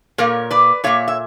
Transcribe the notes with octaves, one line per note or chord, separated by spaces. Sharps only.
A#2 A#3 A#4 C#5
B4 D5
A#2 A#3 C#5 E5
E5